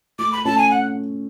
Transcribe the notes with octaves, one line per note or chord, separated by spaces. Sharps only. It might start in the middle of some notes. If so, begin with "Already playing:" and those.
A3 D6
B5
A3 C#4 A5
G#5
F#5